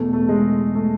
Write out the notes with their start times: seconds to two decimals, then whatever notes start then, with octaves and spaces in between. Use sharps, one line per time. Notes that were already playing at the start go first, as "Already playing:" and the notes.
Already playing: E2 B2 A3
0.13 A3
0.29 G#3
0.75 A3